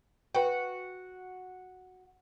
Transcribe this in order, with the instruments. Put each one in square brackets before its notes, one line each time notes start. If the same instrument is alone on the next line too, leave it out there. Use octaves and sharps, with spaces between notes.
[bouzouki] F#4 [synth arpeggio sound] B4 G5